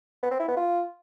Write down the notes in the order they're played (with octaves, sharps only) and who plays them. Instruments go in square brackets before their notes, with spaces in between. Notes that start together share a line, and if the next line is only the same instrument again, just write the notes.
[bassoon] B3
C4
E4
B3
F4